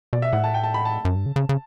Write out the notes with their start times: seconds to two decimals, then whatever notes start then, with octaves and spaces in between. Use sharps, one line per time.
0.13 B2 D5
0.22 E5
0.32 A2 F#5
0.44 A5
0.54 G5
0.63 A5
0.74 B5
0.85 A5
1.05 F#2
1.16 G2
1.26 C#3
1.36 C#3
1.49 C#3